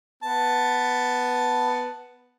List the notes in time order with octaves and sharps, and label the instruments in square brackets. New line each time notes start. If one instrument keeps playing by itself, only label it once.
[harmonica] B3 A5